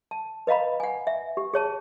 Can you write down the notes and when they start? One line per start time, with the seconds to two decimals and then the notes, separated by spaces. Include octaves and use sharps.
0.11 A5
0.47 B4 D#5 F5 A#5 B5
0.80 F#5 G#5
1.07 E5
1.37 G4
1.54 G#4 C#5 A5